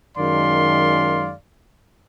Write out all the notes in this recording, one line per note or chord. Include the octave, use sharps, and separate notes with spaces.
F#2 D#3 G#3 D5 F5 C6